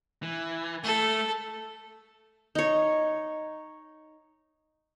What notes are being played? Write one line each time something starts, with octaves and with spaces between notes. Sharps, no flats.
E3
A3 A4
D#4 C#5